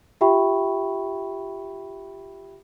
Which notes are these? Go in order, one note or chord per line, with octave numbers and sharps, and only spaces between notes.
F4 G4 E5 G5 B5 C#6